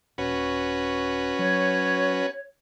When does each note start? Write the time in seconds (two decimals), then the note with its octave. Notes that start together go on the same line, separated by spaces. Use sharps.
0.18 D#1 C#4 F#4 B4
1.39 F#3 C#5